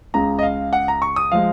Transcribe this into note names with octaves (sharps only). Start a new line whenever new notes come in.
C#2 C#3 G#3 A#5
D#5
F5
F#5
A#5
C#6
D#6
F3 G#3 F5